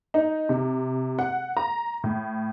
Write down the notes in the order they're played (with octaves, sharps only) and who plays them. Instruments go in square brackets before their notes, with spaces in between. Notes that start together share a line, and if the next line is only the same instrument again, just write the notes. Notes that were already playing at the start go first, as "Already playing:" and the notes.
[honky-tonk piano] D#4
C3
F#5
A#5
A2